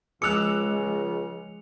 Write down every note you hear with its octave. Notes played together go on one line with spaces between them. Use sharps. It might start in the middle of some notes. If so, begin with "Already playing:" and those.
C#2 F3 G#3 D6 E6 F#6 C#7 F7